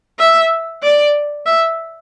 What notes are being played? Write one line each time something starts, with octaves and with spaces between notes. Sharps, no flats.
E5
D5
E5